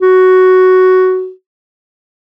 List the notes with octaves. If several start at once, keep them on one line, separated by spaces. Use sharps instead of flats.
F#4